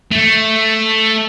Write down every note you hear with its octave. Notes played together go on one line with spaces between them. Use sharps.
A3